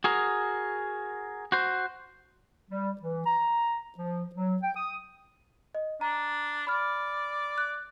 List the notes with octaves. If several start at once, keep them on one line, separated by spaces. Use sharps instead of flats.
F#4 G#4 A#4
F#4 C5
G3
E3
A#5
F3
F#3
G5
D#6
D#5
D4 A#5
D5 B5 F6
F#6